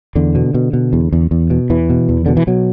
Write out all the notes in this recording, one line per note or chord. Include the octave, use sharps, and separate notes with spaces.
E2 D3
B2
B2
B2
E2
E2
E2
B2
E2 E3
B2
E2
B2 D3
E3
B2 F#3